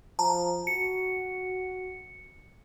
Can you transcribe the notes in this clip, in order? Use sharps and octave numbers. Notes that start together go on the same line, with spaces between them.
F3 A5 A#5
F#4 C#7